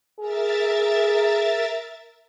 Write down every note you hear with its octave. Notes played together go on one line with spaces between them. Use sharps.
G#4 A#4 E5 A6